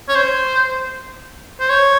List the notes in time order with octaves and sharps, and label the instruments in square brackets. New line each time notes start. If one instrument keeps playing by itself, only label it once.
[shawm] C#5
C5
C5
C#5